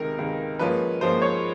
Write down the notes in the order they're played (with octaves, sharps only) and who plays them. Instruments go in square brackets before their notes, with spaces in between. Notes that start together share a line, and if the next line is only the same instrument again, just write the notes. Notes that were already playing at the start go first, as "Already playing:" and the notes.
Already playing: [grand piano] C#2 C3 D#3 [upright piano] A#4
[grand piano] C#2 C3 D#3
[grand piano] G#2 F3 A#3 C#4 F4 [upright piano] B4
[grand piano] G#2 F3 A#3 C#4 F4 [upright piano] C5
[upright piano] C#5